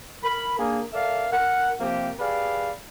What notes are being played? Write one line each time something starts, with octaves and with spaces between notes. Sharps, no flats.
A#4 B5
A#3 D4 G#4
A4 A#4 D5 E5 F5
A#4 F#5
C3 F3 A#3 C4 G4
G4 G#4 B4 D5 F5